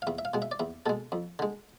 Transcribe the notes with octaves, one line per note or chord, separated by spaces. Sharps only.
F5
E2 E5
E5
F5
B2 G#3
E5
D5
E2 E5
B2 G#3 A4
F2
D3 G#3